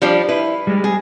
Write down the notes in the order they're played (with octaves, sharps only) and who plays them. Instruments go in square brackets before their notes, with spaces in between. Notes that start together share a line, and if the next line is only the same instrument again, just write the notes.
[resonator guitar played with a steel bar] F3 G3 D4
[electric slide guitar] E4 [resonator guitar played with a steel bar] B4
[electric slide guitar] G3 G#3
[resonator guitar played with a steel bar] G#4